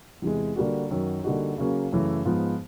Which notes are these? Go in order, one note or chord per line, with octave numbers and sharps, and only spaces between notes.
E2 C3 E3 G#3
D3 G3 A#3 D4 F#4
F#2 D#3 F#3
D3 G3 A#3 D#4 F#4
C#3 F#3 A#3 C#4
F#2 C#3 E3 A3
G#2 F3 G#3 B3